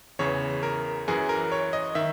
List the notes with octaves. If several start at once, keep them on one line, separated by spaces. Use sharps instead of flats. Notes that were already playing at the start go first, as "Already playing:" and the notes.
E2 C#3 E3 C#5
A#4
F#2 E3 G#4
A#4
C#5
D#5
D#3 E5